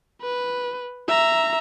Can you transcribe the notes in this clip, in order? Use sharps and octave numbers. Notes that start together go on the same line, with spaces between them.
B4
E5 A#5